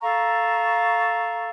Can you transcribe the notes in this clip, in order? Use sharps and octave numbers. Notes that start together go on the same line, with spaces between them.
A4 F5 A#5 C#6